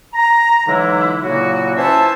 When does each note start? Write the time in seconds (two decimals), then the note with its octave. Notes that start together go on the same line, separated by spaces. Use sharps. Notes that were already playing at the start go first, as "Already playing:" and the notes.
0.13 A#5
0.67 D3 E3 F#3 G#3 D#4 E4
1.22 A#2 C#3 F#3 A#3 E4 F#4
1.76 C#4 E4 B4 C5 E5 A5